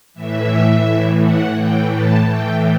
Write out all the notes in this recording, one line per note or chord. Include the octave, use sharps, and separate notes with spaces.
A2 E3 E5
A2
E3
F#5
A2 E3 G5
A5
A2 E3 G5